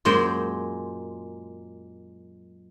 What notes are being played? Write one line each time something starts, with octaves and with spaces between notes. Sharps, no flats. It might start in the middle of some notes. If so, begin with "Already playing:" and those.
F#2 A#2 G#3 C5 G5